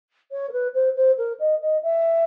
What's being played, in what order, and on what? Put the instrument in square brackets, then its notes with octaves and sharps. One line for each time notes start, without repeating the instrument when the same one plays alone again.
[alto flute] C#5
A#4
B4
C5
C5
A#4
D#5
D#5
E5